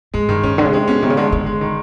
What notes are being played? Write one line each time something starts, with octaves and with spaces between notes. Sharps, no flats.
G#2 G#3
G2 D#3
A2 C#4
D3 G#3
C#3
C3 G#3
B2 C#4
C3 D#3
C#3
D3 G#3
D3 G#3
G#3
D#3